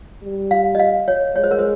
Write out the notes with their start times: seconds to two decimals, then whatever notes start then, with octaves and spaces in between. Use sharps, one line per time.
0.23 G3
0.51 F5
0.75 D#5
0.79 F5
1.08 C#5
1.36 G#3 C#5
1.44 C5
1.51 A#4
1.59 C5